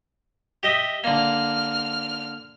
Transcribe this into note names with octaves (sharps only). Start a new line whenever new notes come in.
G4 D#5 E5
D3 A#3 F6